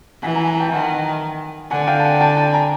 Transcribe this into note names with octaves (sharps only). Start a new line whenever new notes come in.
E3 F#5 G#5
G#5 A#5
G#5 A#5
G5 A5
D#3 F#5 G#5
D3 F#5 G#5
F5 G5
A5
F#5 G#5
G5 A5
G5 A5
G#5 A#5